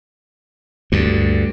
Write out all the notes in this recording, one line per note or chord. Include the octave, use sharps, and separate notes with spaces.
D2 G2